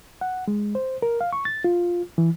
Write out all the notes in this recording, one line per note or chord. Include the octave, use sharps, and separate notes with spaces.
F#5
G#3
C5
A#4
F5
C#6
A6
F4
E3